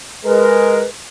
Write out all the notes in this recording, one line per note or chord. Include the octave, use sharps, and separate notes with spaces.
G#3 A#4 B4